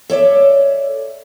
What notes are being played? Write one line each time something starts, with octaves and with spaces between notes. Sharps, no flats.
A4 C#5 D5 E5